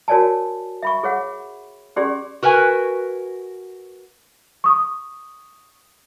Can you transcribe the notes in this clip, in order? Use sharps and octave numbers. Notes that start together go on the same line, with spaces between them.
F#4 A#4 C#5 D5 G#5 A5
E5 B5 C#6
G#4 C#5 F#5
C#4 G4 G#4 D5 C6
F#4 A#4 B4 G#5
C#6 D#6